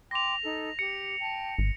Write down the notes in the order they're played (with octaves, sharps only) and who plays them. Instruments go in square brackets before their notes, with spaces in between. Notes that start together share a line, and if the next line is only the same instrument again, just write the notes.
[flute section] G5 C6 D6 [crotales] A#6 F7
[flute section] D#4 A4
[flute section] G4 [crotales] C#7
[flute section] G5 A5
[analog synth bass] G#1